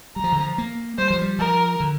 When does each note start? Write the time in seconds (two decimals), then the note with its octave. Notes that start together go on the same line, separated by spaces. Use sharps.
0.16 G3 A#5
0.24 F3
0.32 D3
0.40 F3
0.58 A#3
0.98 G3 C5
1.10 F3
1.22 G3
1.39 F3 A#4
1.80 D3